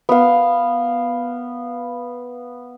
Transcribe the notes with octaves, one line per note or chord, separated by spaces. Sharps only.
B3 F5